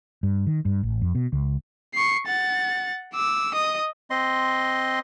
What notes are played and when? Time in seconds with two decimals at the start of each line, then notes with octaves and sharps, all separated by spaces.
0.23 G2
0.47 D#3
0.65 G2
0.83 A1
1.02 F2
1.15 B2
1.33 C#2
1.94 C#6 C7
2.26 F#5 A6
3.14 D6 E6
3.54 D#5 D#6
4.10 C4 D#5 C6